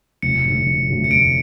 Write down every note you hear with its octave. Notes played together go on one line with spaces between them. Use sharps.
F1 C#7
F2 D3 F#3 A3
F1
F2 D3 F#3 A3
C#7
F1 D7